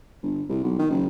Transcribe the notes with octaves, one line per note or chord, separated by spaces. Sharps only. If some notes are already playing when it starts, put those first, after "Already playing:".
G1
C2
B1
D#3
F#1